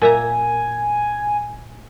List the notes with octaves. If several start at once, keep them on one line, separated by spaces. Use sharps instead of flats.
A#2 E5 G#5 A#5